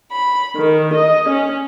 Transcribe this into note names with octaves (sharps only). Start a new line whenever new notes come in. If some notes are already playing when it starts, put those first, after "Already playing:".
B5
D#3
D#5
C#4